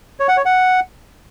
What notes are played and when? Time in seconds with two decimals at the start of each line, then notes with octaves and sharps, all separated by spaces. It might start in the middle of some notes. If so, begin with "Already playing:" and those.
0.20 C#5
0.28 F#5
0.37 C#5
0.45 F#5